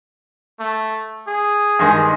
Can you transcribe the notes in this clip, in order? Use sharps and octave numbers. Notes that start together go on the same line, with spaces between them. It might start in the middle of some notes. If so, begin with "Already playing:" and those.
A3
G#4
G2 D#3 G#3